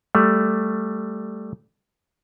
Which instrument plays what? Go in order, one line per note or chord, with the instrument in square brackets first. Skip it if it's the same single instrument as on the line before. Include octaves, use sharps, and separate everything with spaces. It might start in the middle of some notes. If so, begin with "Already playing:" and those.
[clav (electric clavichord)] G3 A3